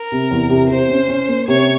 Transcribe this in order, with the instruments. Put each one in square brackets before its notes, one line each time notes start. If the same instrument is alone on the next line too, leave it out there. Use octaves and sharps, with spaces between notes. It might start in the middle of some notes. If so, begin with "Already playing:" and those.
Already playing: [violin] A#4
[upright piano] C3
E2
C3
[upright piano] C3 [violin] C5
[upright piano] C#4
C#4
A#3
[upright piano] C3 [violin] C#5